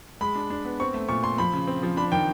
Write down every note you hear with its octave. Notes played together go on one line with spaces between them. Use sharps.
G#3 B5
D4
D4
B3
C4 C#6
A3
A#2 C#6
A3 C6
F3 B5
C#3
C4
F3
D4 B5
D#3 G5